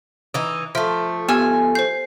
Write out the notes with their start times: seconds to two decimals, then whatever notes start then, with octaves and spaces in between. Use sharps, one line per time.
0.34 E3 D#4
0.75 F3 A3 E5
1.29 B3 G4 G#5 E6 F6
1.75 C5 G6 C7